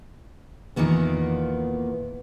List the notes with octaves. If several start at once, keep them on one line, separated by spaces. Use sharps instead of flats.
E2 A#2 D#3 A#3 B3